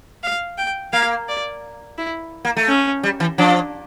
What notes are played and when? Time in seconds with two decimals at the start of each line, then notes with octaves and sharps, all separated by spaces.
0.23 F5
0.58 G5
0.93 A#3 F5
1.28 D5
1.98 E4
2.45 A#3
2.57 A3
2.68 C#4
3.03 G3
3.20 E3
3.38 F3 D4